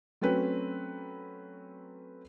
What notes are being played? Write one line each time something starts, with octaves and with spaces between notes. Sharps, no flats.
F#3 A3 C4 C#4 B4